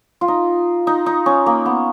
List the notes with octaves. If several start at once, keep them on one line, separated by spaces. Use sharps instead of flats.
F4
D#4
D#4
D#4
C#4
A#3
B3